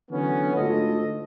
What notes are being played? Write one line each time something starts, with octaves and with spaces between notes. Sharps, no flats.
D3 E3 F#3 B3 C#4
D2 G#2 F4 A4 D#5